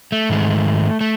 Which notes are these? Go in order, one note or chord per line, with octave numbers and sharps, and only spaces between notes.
A3
G#2 D#3 G#3
A3